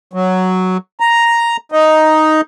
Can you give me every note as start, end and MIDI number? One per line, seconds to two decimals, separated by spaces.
0.13 0.77 54
1.00 1.57 82
1.72 2.41 63